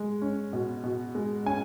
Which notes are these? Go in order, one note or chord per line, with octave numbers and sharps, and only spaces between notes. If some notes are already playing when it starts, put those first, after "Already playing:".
Already playing: G#3
C#4
B2
B2
G#3
C#4 G#5